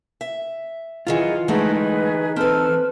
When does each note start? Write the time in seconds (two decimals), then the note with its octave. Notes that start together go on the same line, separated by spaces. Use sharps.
0.21 E5
1.07 F#2 D#3 E3 F4 G#4 D#5 F#5
1.48 E3 G#3 A3 D#4 G#4 B4 F#5
2.36 C4 A4 B4 A5 F6